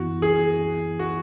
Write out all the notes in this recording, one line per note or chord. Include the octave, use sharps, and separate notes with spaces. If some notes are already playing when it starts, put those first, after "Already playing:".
Already playing: F#2 E3 B3 E4 F#4
G#4
F#4